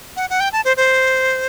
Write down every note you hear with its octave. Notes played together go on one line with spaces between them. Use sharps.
F#5
F#5
G5
A5
C5
C5